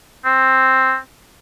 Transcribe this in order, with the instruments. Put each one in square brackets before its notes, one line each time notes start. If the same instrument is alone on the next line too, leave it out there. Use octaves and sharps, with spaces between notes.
[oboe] C4